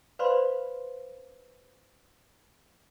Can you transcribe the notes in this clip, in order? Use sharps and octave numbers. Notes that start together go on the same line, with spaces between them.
B4 C5 D5 F5 B5 C6